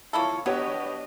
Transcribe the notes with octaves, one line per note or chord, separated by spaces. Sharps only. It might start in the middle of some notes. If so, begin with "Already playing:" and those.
A#3 E4 F4 A4 C#5
F#3 B3 D4 G4 C#5 D#5